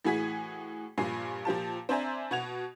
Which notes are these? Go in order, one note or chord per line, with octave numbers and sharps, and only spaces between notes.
A2 E3 F#4 G#4 G#5 B6
G2 A#2 F3 G#5 C7
A#2 F3 G4 A5
C4 D4 C5 E5 G#5 A#5
B2 F#4 G#6 F7